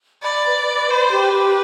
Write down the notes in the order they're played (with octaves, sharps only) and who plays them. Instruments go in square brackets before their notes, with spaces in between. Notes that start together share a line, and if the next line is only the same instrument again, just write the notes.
[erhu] D5 [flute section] B5
[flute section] B4
B4
[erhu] C5 [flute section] B5
[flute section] G4
[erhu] B4
[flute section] G4